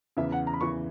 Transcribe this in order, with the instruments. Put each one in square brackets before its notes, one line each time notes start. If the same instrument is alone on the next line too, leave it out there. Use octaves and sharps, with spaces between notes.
[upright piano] E2 C#3 E3 [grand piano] E5
[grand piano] F#5
A#5
B5
[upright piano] E2 C#3 E3 [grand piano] C#6